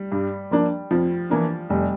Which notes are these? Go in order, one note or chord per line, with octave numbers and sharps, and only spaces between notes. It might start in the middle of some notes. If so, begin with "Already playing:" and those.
Already playing: G3
G2
F3 A#3 D4
F2 F3
E3 A#3 D4
F1 G3